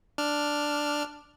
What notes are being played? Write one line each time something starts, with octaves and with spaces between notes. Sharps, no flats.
D4 F6